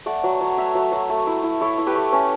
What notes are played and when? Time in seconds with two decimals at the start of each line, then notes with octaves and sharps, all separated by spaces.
0.06 A3 D5 F#5
0.24 F#3
0.41 F#3
0.57 A3 C#5 E5
0.75 F#3
0.92 F#3
1.10 A3
1.27 E4
1.43 E4
1.61 E4 A4 C#5
1.78 E4
1.86 G4 B4
1.95 A3
2.12 C#4